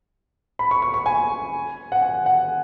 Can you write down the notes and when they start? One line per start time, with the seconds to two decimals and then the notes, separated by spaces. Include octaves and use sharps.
0.59 B5
0.71 C#6
0.82 C#6
0.94 C#6
1.06 G#5
1.92 F#5
2.02 G#5
2.26 F#5